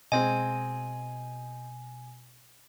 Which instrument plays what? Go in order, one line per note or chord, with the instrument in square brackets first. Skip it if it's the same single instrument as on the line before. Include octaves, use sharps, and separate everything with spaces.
[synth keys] B2 [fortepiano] G#3 C4 D#5 [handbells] G#5